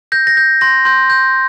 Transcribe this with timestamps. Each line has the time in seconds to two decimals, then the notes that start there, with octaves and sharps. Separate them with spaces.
0.12 G6 A#6
0.27 A#6
0.37 G6
0.61 C6 A#6
0.85 C6 G6
1.10 G6